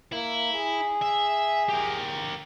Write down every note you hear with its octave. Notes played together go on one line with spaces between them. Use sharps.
A#3 E4
G#4
E5
G4 A#4